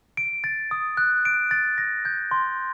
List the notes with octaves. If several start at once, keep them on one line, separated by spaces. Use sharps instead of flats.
D7
A6
D#6
F#6
D7
A6
A#6
G6
C6